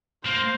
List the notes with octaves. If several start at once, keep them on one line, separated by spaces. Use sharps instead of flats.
A#3 C5